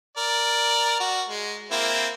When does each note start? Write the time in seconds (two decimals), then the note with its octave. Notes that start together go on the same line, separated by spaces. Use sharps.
0.17 A#4 D5
1.00 F#4
1.29 G#3
1.71 A#3 C4 E4